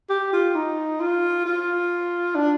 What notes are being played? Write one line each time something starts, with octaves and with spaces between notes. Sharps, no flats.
G4
F4
D#4
F4
F4
D4